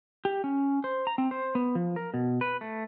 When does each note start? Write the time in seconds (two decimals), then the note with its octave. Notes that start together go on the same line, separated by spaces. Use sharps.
0.25 G4
0.44 C#4
0.84 C5
1.07 A#5
1.18 C4
1.31 C5
1.55 B3
1.75 F3
1.96 A#4
2.14 B2
2.41 B4
2.61 A3